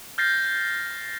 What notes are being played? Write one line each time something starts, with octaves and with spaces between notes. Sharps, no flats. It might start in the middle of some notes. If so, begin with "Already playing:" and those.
F6 G6 A6 A#6 C7